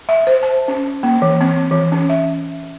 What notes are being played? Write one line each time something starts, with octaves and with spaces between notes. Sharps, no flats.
E5
C5
A5
C#4
A#3
E3
C4
E3
C#4
E5